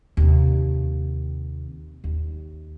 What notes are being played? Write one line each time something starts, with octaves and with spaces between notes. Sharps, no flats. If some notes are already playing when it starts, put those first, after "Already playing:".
D#2 C3
D#2